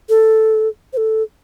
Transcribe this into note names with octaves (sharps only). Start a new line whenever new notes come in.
A4
C5
A4